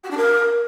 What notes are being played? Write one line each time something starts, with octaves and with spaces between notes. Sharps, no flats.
F#4
D4
A#4